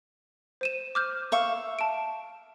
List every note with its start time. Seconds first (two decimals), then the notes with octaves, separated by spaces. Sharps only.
0.61 C5 D#7 E7
0.95 D6 F6 G6
1.32 E5 F5 C#6
1.79 A5 D7